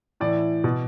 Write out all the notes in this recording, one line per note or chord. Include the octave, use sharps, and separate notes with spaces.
A2 E3 D5
B2